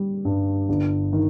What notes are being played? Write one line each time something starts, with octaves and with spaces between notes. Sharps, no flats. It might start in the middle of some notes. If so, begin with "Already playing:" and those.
Already playing: G3
G2
G1
D#3